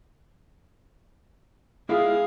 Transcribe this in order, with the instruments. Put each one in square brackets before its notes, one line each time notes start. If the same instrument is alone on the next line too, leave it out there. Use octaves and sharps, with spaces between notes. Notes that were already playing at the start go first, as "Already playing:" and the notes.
[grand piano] G#3 E4 F4 [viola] G#4 F5